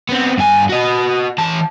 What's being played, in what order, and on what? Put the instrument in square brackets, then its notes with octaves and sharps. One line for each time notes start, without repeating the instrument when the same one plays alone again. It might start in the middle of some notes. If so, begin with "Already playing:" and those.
[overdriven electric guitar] B3 C4
G2 G#5
F#4 D#5
E3 A5